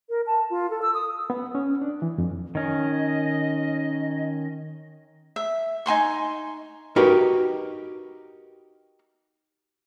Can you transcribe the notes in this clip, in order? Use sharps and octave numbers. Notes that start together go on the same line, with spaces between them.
A#4
A5
F4
A4
E6
D#6
B3
C#4
D4
E3
F2
D#3 C#4 D#5
E5
D#4 G#5 C6 C#6
D#4 F#4 G4 A#4 B4